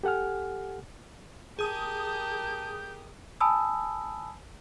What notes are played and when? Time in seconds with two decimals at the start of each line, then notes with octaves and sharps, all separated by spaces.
0.03 G4 A4 F#5 G#5 F6
1.59 G4 G#4 A#4 A5 D#6 G6
3.41 G#5 A5 B5 D#6 E6